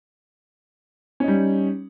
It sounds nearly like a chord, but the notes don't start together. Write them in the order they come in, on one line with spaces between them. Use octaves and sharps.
C#4 D#4 G3